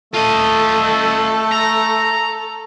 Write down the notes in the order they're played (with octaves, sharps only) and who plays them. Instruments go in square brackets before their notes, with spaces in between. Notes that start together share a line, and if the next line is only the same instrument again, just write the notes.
[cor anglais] A3 [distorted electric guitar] F4 D#5 [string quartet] A4
[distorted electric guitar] A#5